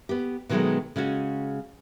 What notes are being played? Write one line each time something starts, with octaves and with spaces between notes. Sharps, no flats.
B3 G4
B2 D#3 F#3 G#3 A3 B3
C#3 G#3 C#4 F#4